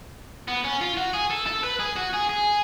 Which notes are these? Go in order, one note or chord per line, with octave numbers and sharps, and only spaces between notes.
B3
C#4
F4
F#4
G#4
A4
A4
B4
G#4
F#4
G#4
G#4